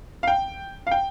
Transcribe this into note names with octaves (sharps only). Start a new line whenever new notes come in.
F5
G5
F5
G5